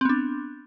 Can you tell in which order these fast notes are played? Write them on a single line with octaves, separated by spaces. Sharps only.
C4 B3 D4